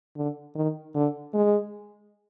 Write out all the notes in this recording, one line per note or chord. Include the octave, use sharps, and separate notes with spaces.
D3
D#3
D3
G#3